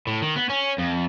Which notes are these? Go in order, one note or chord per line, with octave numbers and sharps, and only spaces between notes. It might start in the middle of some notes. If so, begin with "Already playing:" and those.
A2
D#3
B3
C#4
F2